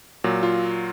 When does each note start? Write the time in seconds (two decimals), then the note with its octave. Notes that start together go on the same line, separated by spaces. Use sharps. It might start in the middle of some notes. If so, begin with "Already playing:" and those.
0.24 A#2 F#3
0.43 F4